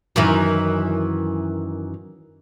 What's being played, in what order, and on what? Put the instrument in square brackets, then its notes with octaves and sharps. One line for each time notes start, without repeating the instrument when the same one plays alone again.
[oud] F#2 D#3 E3